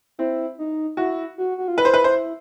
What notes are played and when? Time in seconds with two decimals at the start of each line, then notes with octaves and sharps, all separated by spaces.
0.19 C4 E4
0.59 D#4
0.97 E4 F#4
1.38 F#4
1.58 F#4
1.68 F4
1.77 E4 B4
1.85 C5
1.94 B4
2.04 C5